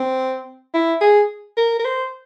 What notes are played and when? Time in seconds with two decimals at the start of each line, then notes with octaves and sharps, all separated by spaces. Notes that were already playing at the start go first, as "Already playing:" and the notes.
Already playing: C4
0.74 E4
1.01 G#4
1.57 A#4
1.79 A#4
1.85 C5